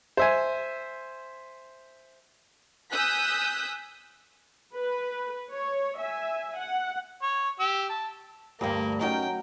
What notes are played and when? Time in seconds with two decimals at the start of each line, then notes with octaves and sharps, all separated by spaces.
0.17 C5 E5 G#5
2.91 G#5 D#6 E6 F#6 G6 B6
4.75 B4
5.51 C#5
5.98 E5 G#5
6.57 F#5
7.22 C#5
7.60 G4 E6
7.89 A5
8.61 D2 G2 G3 A#3
9.01 F#3 C#4 D#4 A#4 G5